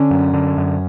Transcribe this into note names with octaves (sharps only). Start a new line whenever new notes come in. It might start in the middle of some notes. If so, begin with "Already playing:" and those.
Already playing: D3 C#4
F#2
D3
F#2